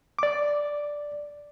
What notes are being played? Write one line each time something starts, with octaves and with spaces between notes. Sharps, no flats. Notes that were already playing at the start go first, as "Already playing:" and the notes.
D5 D6